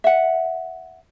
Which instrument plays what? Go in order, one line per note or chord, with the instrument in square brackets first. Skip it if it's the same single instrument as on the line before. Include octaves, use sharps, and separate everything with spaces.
[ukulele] E5 F#5